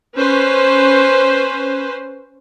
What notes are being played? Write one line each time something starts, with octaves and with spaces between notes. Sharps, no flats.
C#4 B4 C5